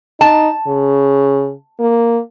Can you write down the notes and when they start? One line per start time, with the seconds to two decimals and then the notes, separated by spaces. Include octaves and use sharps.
0.21 D#4 A5
0.68 C#3
1.80 A#3